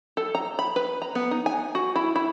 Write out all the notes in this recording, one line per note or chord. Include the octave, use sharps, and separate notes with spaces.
A4
A#5
B5
B4
A#5
B3
D#4
G#5
F#4
E4
E4